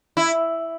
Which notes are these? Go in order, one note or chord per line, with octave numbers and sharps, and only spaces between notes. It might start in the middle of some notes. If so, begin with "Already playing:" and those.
E4